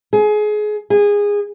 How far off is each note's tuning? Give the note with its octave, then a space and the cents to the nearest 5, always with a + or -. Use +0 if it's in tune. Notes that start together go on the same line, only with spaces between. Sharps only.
G#4 +25
G#4 -20